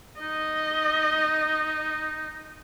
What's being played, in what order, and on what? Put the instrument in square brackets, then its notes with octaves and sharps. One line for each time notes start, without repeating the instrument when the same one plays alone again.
[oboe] D#4 [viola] D#5